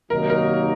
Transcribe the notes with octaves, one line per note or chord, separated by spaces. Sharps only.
C3 D#3 F#3 A#3 D#4 A#4
A#4